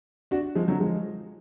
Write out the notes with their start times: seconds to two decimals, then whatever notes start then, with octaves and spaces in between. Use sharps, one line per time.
0.31 D4 F#4
0.55 F3 G#3
0.68 D3 F#3
0.80 F3 G#3